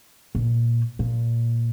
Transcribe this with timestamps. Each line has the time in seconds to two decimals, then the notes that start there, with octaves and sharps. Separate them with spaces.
0.35 A#2
0.99 A#2